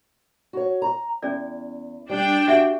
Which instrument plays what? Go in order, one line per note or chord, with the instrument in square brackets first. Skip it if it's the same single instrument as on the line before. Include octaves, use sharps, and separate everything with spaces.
[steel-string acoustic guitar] F#4 C#5
A#5
[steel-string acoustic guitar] E2 [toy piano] C#4 G#4 D5
[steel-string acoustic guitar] G3 [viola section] D4 G5
[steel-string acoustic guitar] F#4 [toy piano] G4 E5 F#5